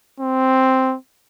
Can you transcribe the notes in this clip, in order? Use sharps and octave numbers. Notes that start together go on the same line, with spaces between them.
C4